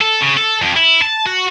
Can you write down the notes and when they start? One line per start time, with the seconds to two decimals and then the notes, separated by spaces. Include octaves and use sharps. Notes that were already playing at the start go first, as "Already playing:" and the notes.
0.01 A4
0.21 C#3
0.37 A4
0.62 F2
0.76 E4
1.02 A5
1.26 F#4